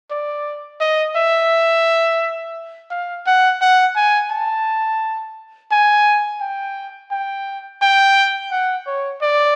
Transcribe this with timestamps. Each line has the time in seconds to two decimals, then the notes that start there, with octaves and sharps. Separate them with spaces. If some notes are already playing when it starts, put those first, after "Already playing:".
0.11 D5
0.81 D#5
1.16 E5
2.91 F5
3.27 F#5
3.61 F#5
3.96 G#5
4.31 A5
5.71 G#5
6.41 G5
7.11 G5
7.82 G5
8.51 F#5
8.87 C#5
9.22 D5